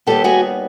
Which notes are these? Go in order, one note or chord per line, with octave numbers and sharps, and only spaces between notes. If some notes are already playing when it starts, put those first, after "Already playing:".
D#2 D#3 G3 B3 G4 A4
F#4 G#4